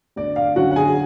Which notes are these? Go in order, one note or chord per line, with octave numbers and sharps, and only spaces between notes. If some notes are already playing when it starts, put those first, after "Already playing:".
D2 D5
F5
D3 F#3 C#4 F#4 F#5
F#5
G#4 G#5